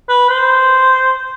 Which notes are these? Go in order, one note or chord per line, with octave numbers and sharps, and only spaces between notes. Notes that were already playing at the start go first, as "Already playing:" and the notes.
B4
C5